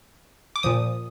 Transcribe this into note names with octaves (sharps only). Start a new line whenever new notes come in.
D6
A#2 F3 D#6